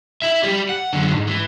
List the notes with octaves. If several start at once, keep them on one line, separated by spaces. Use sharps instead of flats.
E4 E5
G4 D5
F#5
F#2 D3
G#2
E3